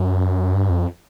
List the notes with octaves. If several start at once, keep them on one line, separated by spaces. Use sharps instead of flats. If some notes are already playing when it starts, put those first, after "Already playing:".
Already playing: F#2
G2
F2